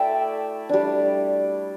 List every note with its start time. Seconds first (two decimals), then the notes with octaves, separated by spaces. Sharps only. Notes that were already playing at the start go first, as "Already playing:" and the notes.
Already playing: A3 E4 D5 E5 G5
0.69 G3 D4